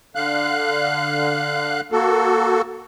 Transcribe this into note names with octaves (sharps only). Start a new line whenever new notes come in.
D3 F5 F#6
A#3 F#4 A4